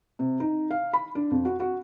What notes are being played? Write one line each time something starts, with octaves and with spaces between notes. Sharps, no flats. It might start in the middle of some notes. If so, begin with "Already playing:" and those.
C3
D#4
F5
B5
D4
F2
F#4
F#4